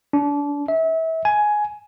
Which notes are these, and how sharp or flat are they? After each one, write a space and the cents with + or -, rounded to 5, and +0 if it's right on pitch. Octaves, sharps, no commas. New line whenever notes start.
D4 -30
E5 -30
G#5 +10